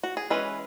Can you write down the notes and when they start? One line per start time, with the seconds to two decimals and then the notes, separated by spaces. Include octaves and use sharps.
0.03 F#4
0.17 G#4
0.30 E3 G#3 C#4 B4